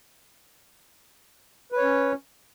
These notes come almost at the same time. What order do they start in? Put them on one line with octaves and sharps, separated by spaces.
B4 C#5 C#4